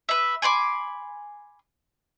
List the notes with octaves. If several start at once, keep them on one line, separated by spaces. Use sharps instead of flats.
B4 E5
G#5 B5 C6 D6